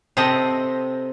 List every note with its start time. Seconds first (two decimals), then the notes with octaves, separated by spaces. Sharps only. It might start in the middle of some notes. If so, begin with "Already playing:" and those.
0.17 C3 C4 A4 D#5